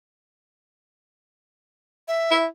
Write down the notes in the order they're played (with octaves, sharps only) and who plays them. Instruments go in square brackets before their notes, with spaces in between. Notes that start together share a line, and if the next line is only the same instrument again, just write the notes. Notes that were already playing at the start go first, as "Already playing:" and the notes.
[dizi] E5
[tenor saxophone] E4